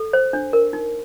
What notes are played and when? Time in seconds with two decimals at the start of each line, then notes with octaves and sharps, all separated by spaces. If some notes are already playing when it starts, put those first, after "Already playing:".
Already playing: A4
0.13 C5
0.33 D4
0.53 A#4
0.73 D#4